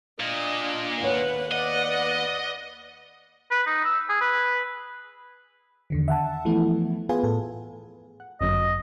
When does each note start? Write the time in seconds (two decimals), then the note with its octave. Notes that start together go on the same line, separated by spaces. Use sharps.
0.20 A#2 D4 D#5
1.00 D#2 B4 C#5 F#5
1.52 B4 D5 D#5 F#5
3.51 B4
3.66 D#4
3.85 E6
4.09 G#4
4.21 B4
5.90 E2 D3 D#3
6.08 E5 F#5 A5
6.45 E3 F3 A3 B3 E4
7.09 B3 F4 G#4 B4 G#5
7.23 A2 A4
8.20 F#5
8.41 G1 F#2 F#3 D#5